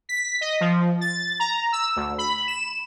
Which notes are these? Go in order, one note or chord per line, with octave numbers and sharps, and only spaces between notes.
B6
D#5
F3
A6
A#5
E6
D2
B5
E7